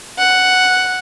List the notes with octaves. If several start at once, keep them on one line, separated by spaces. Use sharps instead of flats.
F#5